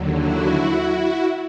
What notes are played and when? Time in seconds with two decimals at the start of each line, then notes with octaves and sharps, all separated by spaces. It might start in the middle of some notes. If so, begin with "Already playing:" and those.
Already playing: D#2 D3 F#3
0.15 E4 F#4